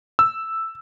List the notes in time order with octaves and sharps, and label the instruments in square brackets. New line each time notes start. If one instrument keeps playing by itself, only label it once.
[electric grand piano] E6